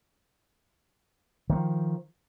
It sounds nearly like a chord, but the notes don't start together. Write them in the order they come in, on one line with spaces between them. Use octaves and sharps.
D#3 G#3 F3